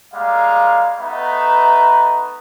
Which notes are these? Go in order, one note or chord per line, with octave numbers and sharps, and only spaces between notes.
G3 G#3 A#3 F5
A3 B3 D#4 B4 E5 A#5